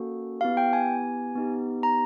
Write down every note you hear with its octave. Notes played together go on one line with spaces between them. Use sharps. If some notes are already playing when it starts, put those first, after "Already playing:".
Already playing: A#3 C#4 F#4 A4
B3 E4 G4 F5
G5
G#5
B3 D#4 G4
A#5